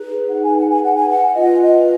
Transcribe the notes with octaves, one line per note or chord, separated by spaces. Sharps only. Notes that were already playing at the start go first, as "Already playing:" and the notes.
Already playing: D#4 G#4 B4
F#5
G#5
F#5
G#5
F#5
G#5
F#5
F4 B4 D#5
D#5